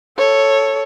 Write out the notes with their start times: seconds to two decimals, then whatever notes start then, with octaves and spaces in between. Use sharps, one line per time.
0.18 A4 C#5